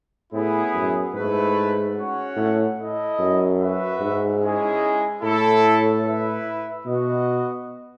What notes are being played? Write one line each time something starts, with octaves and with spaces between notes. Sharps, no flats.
A2 B3 E4 G#4
F#2
G#2 A3 E4 B4
C#4 F#4 C#5 F#5
A2
E4 A4 D#5
F#2
F#4 B4 E5
G#2
G#3 C#4 E4 G#4 D#5
A2 A3 E4 A4
E4 B4 E5
B2 F#4 B4 D#5